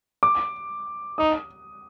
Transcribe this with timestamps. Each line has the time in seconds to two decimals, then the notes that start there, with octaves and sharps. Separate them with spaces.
0.23 D6
1.18 D#4 D#6